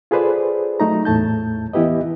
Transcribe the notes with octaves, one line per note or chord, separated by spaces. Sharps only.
F4 G#4 A4 B4 C5 D5
F#3 A3 D#4 A#5
E2 A2 A3 A5 G6
E3 B3 E4 G4 B4 D#5